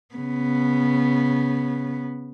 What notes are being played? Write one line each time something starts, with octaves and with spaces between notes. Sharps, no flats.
C#3 B3